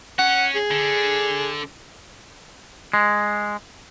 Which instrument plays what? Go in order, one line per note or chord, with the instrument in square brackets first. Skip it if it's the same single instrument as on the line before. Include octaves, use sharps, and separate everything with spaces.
[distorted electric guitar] C#4 [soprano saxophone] F#5
[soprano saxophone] G#4
[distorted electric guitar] D3
[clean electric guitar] G#3